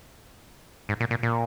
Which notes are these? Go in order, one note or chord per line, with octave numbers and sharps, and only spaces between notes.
G#2
A#2
A#2
A#2